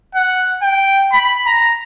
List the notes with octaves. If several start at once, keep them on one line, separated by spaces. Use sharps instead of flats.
F#5
G5
B5
A#5